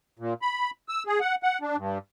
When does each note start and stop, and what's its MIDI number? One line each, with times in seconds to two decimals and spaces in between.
0.19 0.34 46
0.42 0.71 83
0.88 1.03 88
1.07 1.20 68
1.20 1.35 78
1.43 1.58 78
1.62 1.76 62
1.77 1.98 43